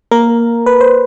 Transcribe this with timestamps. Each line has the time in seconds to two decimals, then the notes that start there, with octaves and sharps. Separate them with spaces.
0.11 A#3 A#4
0.66 B4
0.81 C5